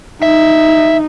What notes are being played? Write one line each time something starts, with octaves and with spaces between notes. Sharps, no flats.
D#4 E5